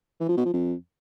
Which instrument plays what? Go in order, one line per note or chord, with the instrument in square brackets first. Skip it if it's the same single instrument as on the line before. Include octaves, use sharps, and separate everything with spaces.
[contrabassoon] E3
F3
B2
F3
F2